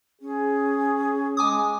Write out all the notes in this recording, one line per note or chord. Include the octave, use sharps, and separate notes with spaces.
C#4 G#4
G#3 G#5 D6 D#6